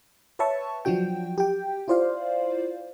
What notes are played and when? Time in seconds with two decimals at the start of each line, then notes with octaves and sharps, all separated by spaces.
0.39 B4 C#5 E5 A5 C#6
0.85 F3 F#3 D4 F#4 G5
1.38 G4 G5
1.88 E4 F4 C5 D5 F5